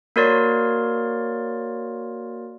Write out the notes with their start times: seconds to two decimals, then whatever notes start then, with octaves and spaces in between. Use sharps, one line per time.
0.16 A#3 F#4 A#4 C#5 D5 C6